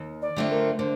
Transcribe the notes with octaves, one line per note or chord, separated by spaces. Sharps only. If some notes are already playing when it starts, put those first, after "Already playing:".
Already playing: D#2
D5
D3 A3 C4 F4
A#4
D3 C5